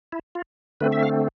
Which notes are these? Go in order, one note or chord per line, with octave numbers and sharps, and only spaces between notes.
E4
F4
D3 A3 C4 B4
E5
F5